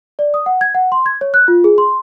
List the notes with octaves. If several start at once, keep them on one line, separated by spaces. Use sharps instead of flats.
D5
D#6
F#5
G#6
F#5
C6
G#6
C#5
F#6
F4
G#4
C6